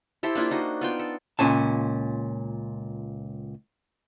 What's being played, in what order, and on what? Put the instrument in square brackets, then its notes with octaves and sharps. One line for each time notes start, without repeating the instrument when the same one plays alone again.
[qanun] E4 G4 A4 C5
A#3 D4 E4 F4
D4 D#4 F#4
B3 F4 G5
A4
[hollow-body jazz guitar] C#2 A#2 C#4 A5